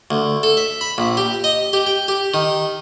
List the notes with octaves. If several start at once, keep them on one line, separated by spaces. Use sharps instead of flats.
D2
A4
E5
B5
A#1
G4
D#5
G4
G5
G4
D#3